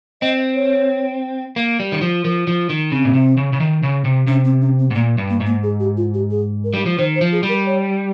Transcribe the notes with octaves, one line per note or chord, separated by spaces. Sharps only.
C4 D#5
C#5
A#3
G3
D#3
F3
F3 A#4
F3
D#3
C#3 C4
A#2
C3
C#3
C#3
D#3
C#3
C3
C3 C#4
C4
C#4
C4
G#2
A#2 A#3
G2
A#3
G#2
A#3
G#4
G4
F4
G4
G#4
A#4
G3
F3
D#3 C5
C5
F3
G#4
G3
A#4
C#5